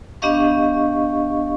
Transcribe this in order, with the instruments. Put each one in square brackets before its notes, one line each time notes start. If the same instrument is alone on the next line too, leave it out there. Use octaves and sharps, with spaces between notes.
[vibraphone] B3 D4 G4 D#5 F5 C#6